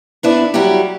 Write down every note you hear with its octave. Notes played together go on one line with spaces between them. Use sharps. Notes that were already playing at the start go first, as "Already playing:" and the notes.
B3 D4 E4
F#3 G3 E4 F#4 G4